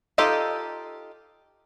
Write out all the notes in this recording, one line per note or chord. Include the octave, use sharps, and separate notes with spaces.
D#4 F4 G4 A4 D#5